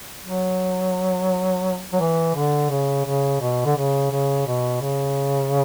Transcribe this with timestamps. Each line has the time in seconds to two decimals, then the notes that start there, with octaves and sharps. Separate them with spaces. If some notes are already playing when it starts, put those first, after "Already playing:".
0.23 F#3
1.93 F#3
2.00 E3
2.35 D3
2.70 C#3
3.06 C#3
3.41 B2
3.65 D3
3.76 C#3
4.11 C#3
4.47 B2
4.81 C#3